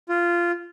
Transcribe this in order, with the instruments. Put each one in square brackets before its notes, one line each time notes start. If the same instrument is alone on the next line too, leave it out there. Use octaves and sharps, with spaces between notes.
[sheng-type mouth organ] F4